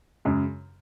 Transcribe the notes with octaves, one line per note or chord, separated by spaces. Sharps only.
F#2 C#3 G#3